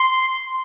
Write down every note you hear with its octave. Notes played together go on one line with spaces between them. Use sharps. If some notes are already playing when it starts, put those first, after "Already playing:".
Already playing: C6